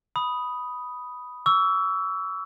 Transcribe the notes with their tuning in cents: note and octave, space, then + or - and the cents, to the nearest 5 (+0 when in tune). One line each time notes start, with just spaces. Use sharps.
B5 +0 D#6 +5
C#6 +40 E6 +0